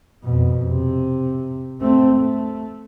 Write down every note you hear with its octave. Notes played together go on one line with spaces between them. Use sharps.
F2 B2
C3
A3 C4
A3